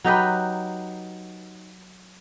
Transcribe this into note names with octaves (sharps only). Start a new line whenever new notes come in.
F#3 D#4 G4 B4